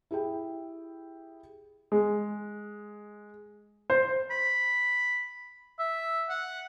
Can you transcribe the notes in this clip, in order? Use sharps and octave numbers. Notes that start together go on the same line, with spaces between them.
E4 G4 G#4 G5
G#3
C5
B5
E5
F#5